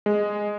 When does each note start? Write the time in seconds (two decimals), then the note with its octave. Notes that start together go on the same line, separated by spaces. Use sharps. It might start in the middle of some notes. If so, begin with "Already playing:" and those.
0.06 G#3